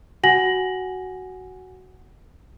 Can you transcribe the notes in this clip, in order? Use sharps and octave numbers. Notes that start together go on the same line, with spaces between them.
F#4 F#5 G#5 A#6 F#7